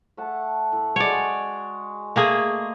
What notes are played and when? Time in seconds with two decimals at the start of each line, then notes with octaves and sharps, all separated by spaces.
0.17 A3 F#5 A5
0.72 A2
0.96 G#3 F#4 C#5 D5
2.16 A3 A#3 G#4